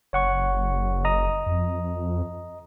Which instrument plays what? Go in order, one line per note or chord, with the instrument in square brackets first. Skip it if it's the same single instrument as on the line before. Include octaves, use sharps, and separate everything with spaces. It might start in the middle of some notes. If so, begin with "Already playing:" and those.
[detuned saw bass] F#1 [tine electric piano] C#5 F#5 C#6
[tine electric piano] D#5 A#5 D#6
[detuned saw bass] F2